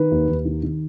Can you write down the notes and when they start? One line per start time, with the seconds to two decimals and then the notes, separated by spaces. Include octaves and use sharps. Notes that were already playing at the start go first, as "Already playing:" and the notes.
Already playing: D#3 B4
0.11 D#2
0.28 D#2
0.45 D#3
0.63 D#3